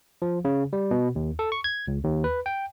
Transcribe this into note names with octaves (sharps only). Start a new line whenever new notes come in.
F3
C#3
G3
B2
D#2
A4
C#6
G#6
C#2
D#2
B4
G5